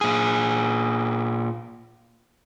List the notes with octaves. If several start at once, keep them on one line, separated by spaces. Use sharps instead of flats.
A#2 G#4